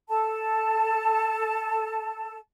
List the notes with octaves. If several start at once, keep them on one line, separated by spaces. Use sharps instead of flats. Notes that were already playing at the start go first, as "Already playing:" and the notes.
A4 A5